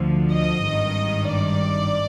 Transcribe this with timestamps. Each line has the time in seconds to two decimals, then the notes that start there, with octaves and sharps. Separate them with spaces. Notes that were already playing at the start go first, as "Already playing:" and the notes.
Already playing: D2 D3 F3
0.31 D#5
0.63 G#1 G2 D#3
1.27 D5